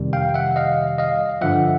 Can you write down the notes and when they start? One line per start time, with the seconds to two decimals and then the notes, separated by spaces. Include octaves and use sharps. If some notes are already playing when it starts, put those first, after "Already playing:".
Already playing: F2 C3 D#3 G3
0.13 F5 G5
0.34 E5 F#5
0.56 D#5 F5
0.98 D#5 F5
1.41 G2 D3 F3 E5 F#5